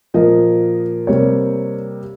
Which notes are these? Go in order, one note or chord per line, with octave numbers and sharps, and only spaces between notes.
A#2 F3 A#3 D#5
C3 G3 A#3 C#5